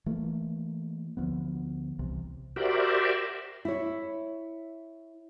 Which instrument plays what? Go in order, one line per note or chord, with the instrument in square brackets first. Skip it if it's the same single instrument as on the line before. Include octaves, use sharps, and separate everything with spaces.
[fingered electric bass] E3 A3 A#3
D2 F3 B3
C2 C3 E3
[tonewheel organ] F#4 G4 A#4 C5 D5 E5
[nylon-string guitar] E4 C#5